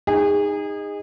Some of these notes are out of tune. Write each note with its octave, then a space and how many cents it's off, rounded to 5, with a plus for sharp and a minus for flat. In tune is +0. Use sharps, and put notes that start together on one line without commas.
D#4 -5 G#4 -30